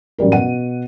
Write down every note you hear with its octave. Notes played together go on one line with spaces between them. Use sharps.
A1 F#3 G3 A#4
B2 F#5 D#7